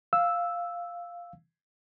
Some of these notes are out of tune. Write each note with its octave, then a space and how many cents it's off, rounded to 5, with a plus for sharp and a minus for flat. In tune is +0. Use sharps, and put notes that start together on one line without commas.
F5 +0 E6 +0